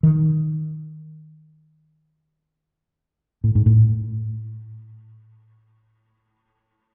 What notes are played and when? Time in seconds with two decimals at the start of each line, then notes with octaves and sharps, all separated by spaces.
0.03 D#3
3.44 A2
3.55 G#2
3.66 A2